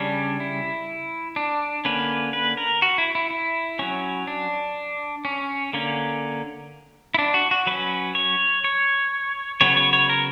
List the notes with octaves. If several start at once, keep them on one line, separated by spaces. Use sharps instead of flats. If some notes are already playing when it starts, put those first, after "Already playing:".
Already playing: C#3 G3 C#4 D4
E4
D4
D3 A#3 C#4 B4
B4
A#4
F#4
E4
E4
E4
F#3 C#4
D4
C#4
D3 A#3 C#4
E4
D4
F#4
F#4
F#3 C#4 B4
C#5
C#5
C#3 F#3 B3 C#5
C#5
C#5
A#4